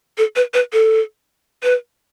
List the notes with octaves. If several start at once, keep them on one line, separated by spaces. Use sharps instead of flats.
A4
B4
B4
A4
B4